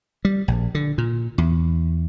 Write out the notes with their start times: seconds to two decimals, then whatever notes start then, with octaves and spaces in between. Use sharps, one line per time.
0.25 G3
0.48 A#1
0.75 D3
0.98 A#2
1.38 E2